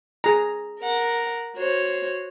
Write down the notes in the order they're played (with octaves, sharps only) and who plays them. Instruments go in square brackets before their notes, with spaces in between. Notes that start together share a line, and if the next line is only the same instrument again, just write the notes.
[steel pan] G#4 A#5
[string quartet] A#4 F#5
F#4 C5 C#5